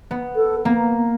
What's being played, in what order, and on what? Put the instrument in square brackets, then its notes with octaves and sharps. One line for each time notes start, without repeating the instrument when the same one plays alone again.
[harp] B3
[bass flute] A4
[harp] A#3 [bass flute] B3